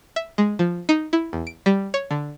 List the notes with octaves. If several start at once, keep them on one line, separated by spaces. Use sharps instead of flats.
E5
G#3
F3
D#4
E4
E2
D7
G3
C#5
D3